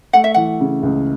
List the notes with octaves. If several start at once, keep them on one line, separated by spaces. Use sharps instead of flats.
A3 F#5
E5
E3 F#5
C#3
C#2